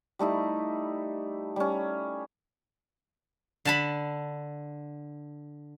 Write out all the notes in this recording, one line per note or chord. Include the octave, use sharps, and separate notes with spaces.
G3 A3 D#4 E4
G3 C#4
D3 A5 B5